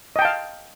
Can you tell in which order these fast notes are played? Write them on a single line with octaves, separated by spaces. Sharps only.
D#5 G5 A5 F5